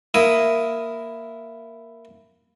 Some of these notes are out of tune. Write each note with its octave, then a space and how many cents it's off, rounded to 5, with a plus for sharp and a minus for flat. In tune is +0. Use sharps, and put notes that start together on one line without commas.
A#3 +0 E4 +5 D#6 +0